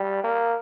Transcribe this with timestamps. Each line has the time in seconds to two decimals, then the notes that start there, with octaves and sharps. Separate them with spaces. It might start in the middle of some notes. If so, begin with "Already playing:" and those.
Already playing: G3
0.24 A#3